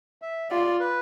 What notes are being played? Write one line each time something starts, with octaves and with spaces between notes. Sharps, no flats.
E5
F4 D5
B4